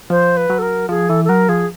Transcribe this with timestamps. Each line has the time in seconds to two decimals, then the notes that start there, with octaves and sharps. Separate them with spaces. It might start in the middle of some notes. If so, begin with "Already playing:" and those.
0.10 F3 C5
0.37 B4
0.50 F#3
0.59 A4
0.62 A#4
0.89 F3 G#4
1.09 E3 A4
1.25 A4
1.29 F#3 A#4
1.49 F3 G#4